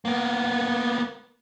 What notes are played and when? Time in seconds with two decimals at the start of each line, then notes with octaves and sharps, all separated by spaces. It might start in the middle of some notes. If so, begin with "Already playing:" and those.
0.05 A#3 B3